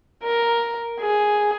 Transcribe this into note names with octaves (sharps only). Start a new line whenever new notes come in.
A#4
G#4